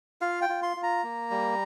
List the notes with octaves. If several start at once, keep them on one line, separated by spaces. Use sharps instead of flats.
F4 F5
G5
F4
C6
F4
A#5
A#3
G3